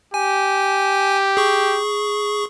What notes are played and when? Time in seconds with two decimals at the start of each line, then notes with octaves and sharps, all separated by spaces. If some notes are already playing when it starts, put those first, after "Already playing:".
0.14 G4 G#5
1.37 G#4 C#6